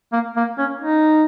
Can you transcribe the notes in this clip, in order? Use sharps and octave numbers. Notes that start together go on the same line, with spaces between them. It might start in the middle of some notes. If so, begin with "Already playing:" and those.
A#3
A#3
C#4
D#4